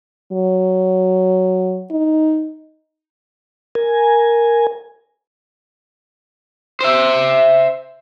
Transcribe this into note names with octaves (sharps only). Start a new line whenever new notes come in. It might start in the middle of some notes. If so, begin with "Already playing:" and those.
F#3
D#4
A#4 G#5
C5 E5